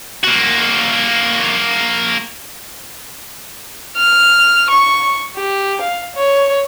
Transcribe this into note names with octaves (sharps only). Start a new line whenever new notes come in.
A#3 F#4
F6
C#6
G4
F5
C#5